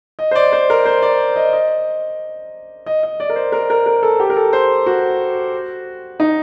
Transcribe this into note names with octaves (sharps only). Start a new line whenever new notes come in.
D#5
C5
D5
C5
A#4
C5
D5
D#5
D#5
D#5
D#5
D5
A#4
C5
A#4
A#4
A#4
A4
G4
A#4
A4
C5
F#4
D#4